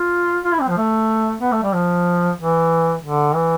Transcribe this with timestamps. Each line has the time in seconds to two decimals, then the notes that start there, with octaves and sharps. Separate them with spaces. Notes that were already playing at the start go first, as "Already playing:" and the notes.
Already playing: F4
0.44 F4
0.53 E4
0.60 C4
0.69 F3
0.77 A3
1.41 B3
1.52 A3
1.63 G3
1.73 F3
2.38 E3
3.03 D3
3.35 E3